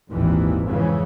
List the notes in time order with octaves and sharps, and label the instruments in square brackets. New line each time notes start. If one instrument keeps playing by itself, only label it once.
[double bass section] G#1 D#2 A#2 E3
F2 G#2 C#3 E3